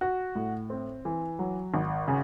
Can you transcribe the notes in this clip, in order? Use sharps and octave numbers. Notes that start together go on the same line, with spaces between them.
F#4
A2
C4
E3
F#3
G#1
C#3